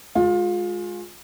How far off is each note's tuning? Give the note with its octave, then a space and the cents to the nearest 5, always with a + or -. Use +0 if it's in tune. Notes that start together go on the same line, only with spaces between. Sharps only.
G#3 +0 F4 +30